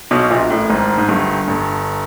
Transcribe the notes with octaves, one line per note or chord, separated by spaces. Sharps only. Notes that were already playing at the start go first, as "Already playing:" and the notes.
B1 B2
A#1 A#2
A1 A2
G#1 G#2
G#2
G1 G2
G1 G2